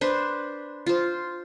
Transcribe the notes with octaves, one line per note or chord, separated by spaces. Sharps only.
D4 B4 C5
F4 C5